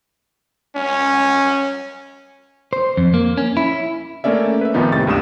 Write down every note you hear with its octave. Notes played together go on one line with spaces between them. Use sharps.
C#4
C5
F2
A#3
C#4
E4
A3 A#3 C#4 D5 E5
B4 E5
F2 A#2 D#3 B3 D#4
A2 C3 A6
C#2 G2 D#6 E7